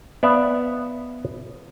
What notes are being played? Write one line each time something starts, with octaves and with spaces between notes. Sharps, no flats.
B3 D5 E5 F5